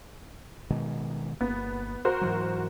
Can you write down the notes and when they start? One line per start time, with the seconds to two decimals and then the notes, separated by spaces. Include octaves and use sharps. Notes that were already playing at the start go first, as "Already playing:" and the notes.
0.70 B2 D#3 G#3
1.41 G1 A#3 B3
2.05 F#4 A#4 C5
2.21 G#2 E3 F#3